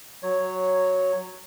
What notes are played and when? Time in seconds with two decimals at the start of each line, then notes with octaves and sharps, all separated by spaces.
0.23 F#3 C#5